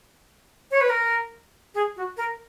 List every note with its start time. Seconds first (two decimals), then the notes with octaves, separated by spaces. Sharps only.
0.71 C#5
0.81 B4
0.90 A#4
1.75 G#4
1.96 F#4
2.17 A#4